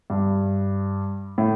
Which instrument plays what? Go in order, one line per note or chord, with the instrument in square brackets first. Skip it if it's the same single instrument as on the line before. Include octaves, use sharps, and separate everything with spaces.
[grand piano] G2
A2